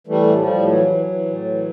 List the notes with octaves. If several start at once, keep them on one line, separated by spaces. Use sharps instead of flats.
E3 G3 A3
A2
F3 G3
A2
E3 F#3
E3
E3
A2
E3